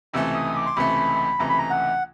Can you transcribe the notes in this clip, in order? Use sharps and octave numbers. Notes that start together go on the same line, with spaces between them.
C#2 C3 E3 A3 E6
D#6
D6
C6
C#2 C3 E3 A3 B5
C#2 C3 E3 A3 A#5
B5
A#5
F#5